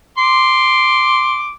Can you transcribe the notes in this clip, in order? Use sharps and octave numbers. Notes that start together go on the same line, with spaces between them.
C6 D6